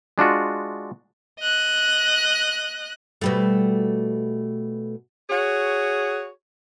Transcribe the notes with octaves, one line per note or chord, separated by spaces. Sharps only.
G#3 D4 F4 F#4
D#5 F#6
B2 G3 A3
F#4 G#4 C#5